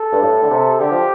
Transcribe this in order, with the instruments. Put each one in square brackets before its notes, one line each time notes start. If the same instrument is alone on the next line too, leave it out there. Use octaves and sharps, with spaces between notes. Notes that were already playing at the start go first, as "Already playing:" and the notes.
Already playing: [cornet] A4
[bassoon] G2
A2
D3
C3
[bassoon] D3 [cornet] G4
[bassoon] F3